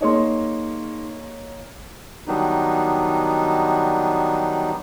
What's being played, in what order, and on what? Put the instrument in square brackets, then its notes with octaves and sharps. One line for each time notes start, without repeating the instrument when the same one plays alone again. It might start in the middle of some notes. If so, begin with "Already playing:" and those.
[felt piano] A#3 C#5 D#5 [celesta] D#4 G#4 C6
[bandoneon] D#3 F#3 G3 B3 D4 D#4